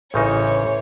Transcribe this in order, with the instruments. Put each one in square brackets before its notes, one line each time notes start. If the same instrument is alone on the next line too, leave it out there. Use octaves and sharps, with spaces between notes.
[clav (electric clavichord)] A1 C#3 D#4 [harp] A2 [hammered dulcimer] E3 C5 [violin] C#5